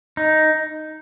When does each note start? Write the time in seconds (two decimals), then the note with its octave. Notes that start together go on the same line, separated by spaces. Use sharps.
0.17 D#4